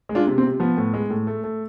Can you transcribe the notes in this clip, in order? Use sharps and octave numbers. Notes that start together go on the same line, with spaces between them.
G#3
D4 F4
C3
C4
C3
F3 B3
A2
G#3
A2
A3
A3